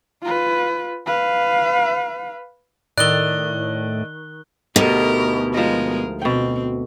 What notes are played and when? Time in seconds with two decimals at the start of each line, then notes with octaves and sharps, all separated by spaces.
0.22 F4 B4
1.06 B4 F5
2.98 A2 D#3 D5 D#5 A5 E6 F#6 G7
4.76 D2 B2 D#4 G4 A#4
5.54 F3 G#3 A#4 D#5
6.22 B2 C4 G5